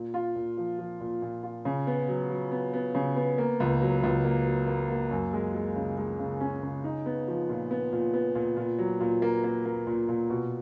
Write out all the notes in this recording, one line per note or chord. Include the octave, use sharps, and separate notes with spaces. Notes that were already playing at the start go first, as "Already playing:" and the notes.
Already playing: A#2
F4
A#2
F3
F3
A#2
A#2
F4
C#3
B3
F#3
F#3
B3
B3
C#3
B3
A#3
C#2
F#3
C#2
A#3
F#3
A#3
A#3
F#2
G#3
G#3
C#3
G#3
C#3
C#4
C#3
D#4
B3
F3
A#2
B3
A#2
B3
A#2
A#2
F#3
A#2
A#3
A#3
A#3
A#2
A#2
B2